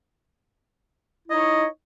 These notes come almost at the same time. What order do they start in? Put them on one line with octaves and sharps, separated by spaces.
E4 D#5 D#4 C#5